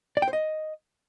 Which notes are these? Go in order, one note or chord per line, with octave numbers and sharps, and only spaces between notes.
D5
G5
C5
D#5